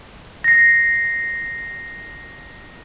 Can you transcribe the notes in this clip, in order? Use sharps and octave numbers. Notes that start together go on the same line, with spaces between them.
A#6 C7